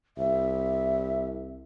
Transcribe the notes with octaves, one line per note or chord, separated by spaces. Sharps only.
C2 E5